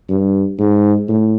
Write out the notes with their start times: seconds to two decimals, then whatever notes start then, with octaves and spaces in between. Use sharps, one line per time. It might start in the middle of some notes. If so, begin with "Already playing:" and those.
0.10 G2
0.59 G#2
1.09 A2